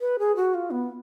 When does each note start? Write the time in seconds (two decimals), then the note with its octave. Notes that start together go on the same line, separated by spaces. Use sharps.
0.01 B4
0.19 G#4
0.36 F#4
0.54 F4
0.71 B3